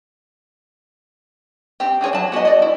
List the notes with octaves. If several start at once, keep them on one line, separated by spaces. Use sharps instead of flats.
C4 G4
C4 C#4 G#4 C#5
F#3 A5
B3 F#4 G#4 D#5
D5 D#5
E4